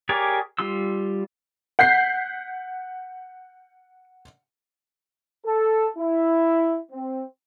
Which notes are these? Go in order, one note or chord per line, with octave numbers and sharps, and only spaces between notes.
G4 G#4 A#4 C#5 D5
G3 F4 C6 E6
F#5 G6 B6 C7
A4
E4
C4